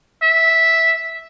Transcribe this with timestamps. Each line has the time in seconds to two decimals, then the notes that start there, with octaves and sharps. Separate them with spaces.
0.22 E5